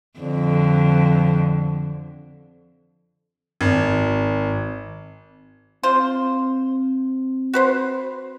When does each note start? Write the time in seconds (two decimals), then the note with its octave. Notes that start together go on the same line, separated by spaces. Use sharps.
0.20 F2 D3
3.61 G#1
5.83 C4 F4 C5
7.54 F#4 B4 C5